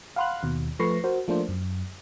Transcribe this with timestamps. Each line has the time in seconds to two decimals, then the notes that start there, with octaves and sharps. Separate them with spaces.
0.16 F5 F#5 B5 C6 F6 F#6
0.43 D#2 B2
0.79 F3 A3 B4 C#6 A#6 C7
1.04 F#4 A#4 C5
1.28 F3 A3 A#3 D4 C5
1.48 F#2